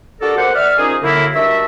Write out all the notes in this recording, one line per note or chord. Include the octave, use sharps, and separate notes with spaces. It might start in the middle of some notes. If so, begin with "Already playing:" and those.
D4 F#4 G4 A4 A#4 D5
D#2 C5 F#5
D5 E5 F6
D#3 F3 C#4 D#4 G#4
F#2 D3 A#3 E4
G2 D#3 D4 F#4 E5